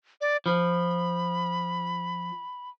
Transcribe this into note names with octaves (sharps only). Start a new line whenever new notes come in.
D5
F3 B5